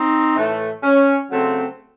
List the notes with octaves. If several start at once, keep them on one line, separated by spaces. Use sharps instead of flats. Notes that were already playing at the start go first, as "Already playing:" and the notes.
Already playing: C4 D#4
A2 E3 A3
C#4
C#3 F#3 A3 C4